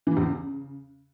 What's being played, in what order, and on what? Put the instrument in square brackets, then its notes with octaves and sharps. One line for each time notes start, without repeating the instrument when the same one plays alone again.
[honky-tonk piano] E3
G2
E2
C#3